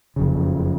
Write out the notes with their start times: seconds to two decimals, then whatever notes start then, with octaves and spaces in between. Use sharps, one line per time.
0.16 F#1 F2 C#3